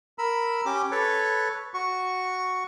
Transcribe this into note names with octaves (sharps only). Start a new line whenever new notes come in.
A#4 B5 E6
C#4 G4 D6
A4 B4 C#5
F#4 C#6